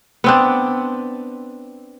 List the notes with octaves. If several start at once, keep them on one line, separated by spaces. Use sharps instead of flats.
B3 C4 D4